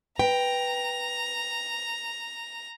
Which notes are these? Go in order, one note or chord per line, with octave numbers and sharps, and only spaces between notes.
B4 G5 A#5